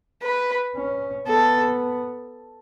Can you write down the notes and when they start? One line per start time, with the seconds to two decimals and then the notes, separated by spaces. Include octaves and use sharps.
0.22 B4
0.76 C#4
1.27 B3 A4